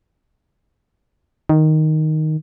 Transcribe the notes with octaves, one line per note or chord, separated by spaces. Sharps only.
D#3